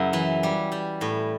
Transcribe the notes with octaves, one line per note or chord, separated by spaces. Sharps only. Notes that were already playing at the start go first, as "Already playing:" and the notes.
Already playing: F#2 C#3 E4
E3
G3
G3
A2